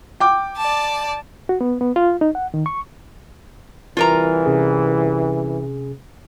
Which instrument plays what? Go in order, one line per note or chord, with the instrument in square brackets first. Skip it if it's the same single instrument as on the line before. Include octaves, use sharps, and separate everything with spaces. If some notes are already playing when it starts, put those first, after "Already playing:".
[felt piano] G5 D6
[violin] D5 A5
[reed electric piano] F#4
B3
B3
F4
D#4
F#5
D#3
C#6
[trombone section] C2 E3 [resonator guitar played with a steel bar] F4 A#4 A#5
[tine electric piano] C3 C#4 G#4